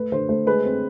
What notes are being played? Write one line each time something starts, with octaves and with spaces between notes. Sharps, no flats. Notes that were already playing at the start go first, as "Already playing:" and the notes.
Already playing: A3 B4
D3 C5
A3 C5
G#3 B4
C4